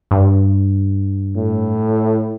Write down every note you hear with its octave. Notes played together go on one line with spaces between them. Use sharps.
G2
A2